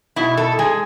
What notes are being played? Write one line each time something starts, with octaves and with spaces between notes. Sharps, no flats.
B2 E4
A4
G#3 G#4